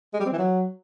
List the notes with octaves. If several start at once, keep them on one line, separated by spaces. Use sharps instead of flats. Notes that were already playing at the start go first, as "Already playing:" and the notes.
G#3
G3
C4
E3
F#3